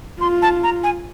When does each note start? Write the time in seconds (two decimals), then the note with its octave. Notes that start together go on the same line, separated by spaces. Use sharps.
0.21 F4 C6
0.42 A5
0.63 A#5
0.83 G#5